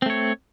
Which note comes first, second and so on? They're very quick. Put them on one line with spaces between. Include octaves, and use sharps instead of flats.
C4 A3 C#5